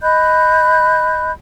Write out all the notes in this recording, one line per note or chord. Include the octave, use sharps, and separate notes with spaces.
D#5 B5 F#6 G6